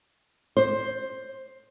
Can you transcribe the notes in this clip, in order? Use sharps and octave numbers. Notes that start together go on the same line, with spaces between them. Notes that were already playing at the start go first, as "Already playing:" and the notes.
C5